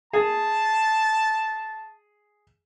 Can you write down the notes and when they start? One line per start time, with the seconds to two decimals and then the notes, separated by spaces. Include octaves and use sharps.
0.13 G#4 A5